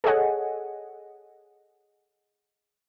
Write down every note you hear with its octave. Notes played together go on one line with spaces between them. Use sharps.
G#4 A4 C#5 D#5 F#5 G#5